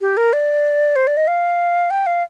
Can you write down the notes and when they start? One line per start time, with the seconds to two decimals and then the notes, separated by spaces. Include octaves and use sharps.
0.01 G4
0.17 A#4
0.33 D5
0.96 C5
1.07 D5
1.17 D#5
1.28 F5
1.91 G5
2.06 F5